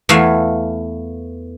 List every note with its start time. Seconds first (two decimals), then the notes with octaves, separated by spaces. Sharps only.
0.09 E2 E3 A3 E5 F5 G#5